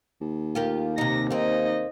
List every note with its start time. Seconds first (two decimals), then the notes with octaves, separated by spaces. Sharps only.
0.21 D#2
0.55 F4 G4 A#4
0.98 C3 D#4 A#6
1.31 A#3 C4 D#4 D#5